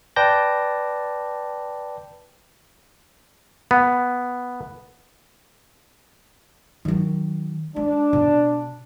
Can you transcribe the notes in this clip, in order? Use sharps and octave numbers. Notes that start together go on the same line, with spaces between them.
B4 D5 G5 A5 G6 A#6
B3
D#3 F#3
G#3 D4
B2